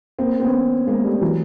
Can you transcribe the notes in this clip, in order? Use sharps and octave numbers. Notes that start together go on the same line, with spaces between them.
A#3 C4
C4
B3 C#4
G#3 A#3
G3 A3
E3 F#3